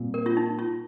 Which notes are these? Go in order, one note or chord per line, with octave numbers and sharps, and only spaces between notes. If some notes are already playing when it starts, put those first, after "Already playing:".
Already playing: A#2 G3 C4
A#4
F4
D#4
F4